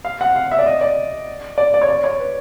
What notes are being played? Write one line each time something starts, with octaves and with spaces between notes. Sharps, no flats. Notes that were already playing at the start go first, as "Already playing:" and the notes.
F5
F#5
F5
E5
D5
D#5
D5
D5
D5
C#5
D5
C#5
B4